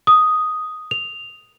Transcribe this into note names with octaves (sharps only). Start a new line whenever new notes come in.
D#6
F7